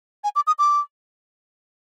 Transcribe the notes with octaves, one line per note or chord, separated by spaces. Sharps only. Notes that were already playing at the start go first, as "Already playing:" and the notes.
G#5
D6
D#6
D6